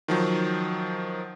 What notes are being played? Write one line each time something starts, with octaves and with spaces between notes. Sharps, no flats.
D#3 F3 F#3